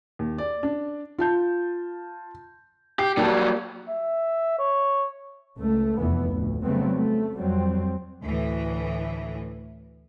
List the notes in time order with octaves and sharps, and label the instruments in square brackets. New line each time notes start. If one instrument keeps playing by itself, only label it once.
[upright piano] D#2
D5
D4
[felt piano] F4 A5 G6
[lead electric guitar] G4 [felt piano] C7
[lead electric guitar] F#3 G3 [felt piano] A#3 G4 A5
[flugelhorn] E5
C#5
[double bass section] C#2 A3
F1 E2 E3 B3
D2 A2
C#3 F#3 G3 A3 B3 C4
A3
F2 F#3 G3 C4
[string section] D2 A2 E3